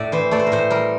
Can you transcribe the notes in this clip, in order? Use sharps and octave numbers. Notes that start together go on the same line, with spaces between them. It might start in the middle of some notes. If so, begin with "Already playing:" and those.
Already playing: A2 D5 E5
E3 C5
A3 D5
C5
A#4
A2 C5
G3 A#4